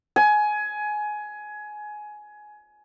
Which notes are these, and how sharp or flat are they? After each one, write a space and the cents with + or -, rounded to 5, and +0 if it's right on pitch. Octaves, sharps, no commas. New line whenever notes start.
G#5 +20